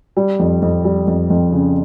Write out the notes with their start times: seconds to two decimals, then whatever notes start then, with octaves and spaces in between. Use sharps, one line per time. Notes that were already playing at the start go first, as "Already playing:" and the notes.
0.17 G3
0.39 F2
0.62 F2
0.85 G3
1.07 F2
1.30 F2
1.52 C#3